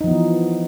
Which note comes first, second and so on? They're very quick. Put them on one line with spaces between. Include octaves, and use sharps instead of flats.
D#4 F3 B3 E3